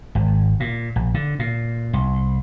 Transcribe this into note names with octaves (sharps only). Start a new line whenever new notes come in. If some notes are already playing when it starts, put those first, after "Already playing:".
G#1
A#2
A#1
D3
A#2
C2